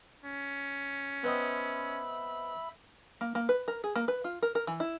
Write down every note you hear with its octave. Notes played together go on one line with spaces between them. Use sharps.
C#4
B3 C4 D#5 E5 B5 E6
A#3
A#3
B4
A#4
G#4
A#3
B4
F4
A#4
A#4
E3
E4